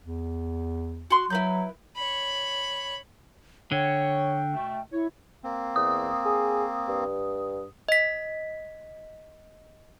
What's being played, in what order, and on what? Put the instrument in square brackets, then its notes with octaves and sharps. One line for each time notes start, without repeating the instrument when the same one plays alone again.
[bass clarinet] E2
[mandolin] F#4 C6
[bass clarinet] F#3 [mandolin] E4 B4 G6
[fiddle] C#5 B5
[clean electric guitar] D3 [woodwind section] C#5 [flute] G5
[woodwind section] B2 A3
[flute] E4 [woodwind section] C#5
[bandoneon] A#3 C4
[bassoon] E2 [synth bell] D#6
[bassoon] G#4
G2
[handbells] D#5 B6